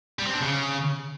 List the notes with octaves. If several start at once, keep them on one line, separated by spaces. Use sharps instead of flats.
G3
C4
D4
C#3